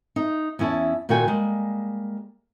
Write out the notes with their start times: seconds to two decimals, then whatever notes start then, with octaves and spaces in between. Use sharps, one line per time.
0.16 D#4
0.59 E2 C#4 E4 A5
1.09 A#2 D#3 A#3 F#4 G5 G#5
1.27 G3 G#3 A#3